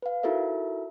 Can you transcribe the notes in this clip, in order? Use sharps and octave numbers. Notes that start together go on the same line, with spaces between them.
B4 F5
D#4 E4 F#4 A4 A#4 E5